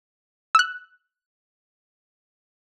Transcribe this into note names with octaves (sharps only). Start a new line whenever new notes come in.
E6 F#6